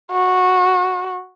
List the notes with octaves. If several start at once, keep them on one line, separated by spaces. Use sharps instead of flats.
F#4